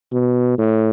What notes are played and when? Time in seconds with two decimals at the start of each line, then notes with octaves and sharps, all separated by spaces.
0.12 B2
0.59 A2